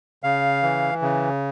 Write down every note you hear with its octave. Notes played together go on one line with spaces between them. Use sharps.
C#3 F5
E3
C#3